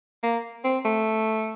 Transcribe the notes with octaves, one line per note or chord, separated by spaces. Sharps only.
A#3
C4
A3